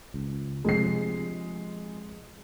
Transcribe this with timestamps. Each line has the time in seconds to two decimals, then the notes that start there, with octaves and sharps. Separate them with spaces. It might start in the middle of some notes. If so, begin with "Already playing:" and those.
0.14 C#2
0.65 C3 F3 G#3 D4 C7